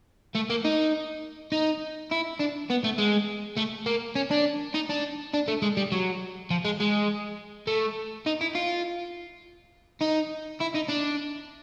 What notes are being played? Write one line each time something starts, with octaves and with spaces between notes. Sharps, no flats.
A3
A#3
D#4
D#4
E4
D4
B3
A3
G#3
A3
A#3
C#4
D4
D#4
D4
D4
A3
G#3
G3
F#3
F3
G#3
G#3
A3
D#4
E4
F4
D#4
E4
D#4
D4